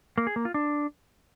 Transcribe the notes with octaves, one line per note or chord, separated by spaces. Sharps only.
A#3
G#4
A#3
F4
D4